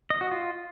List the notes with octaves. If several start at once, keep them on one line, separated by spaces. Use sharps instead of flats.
D#5
F#4
F4